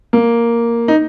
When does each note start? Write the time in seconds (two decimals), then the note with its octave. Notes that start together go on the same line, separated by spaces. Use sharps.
0.13 A#3
0.88 D#4